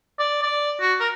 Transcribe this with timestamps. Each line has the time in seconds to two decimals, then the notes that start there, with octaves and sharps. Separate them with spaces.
0.19 D5
0.43 D5
0.81 F#4
1.00 A#4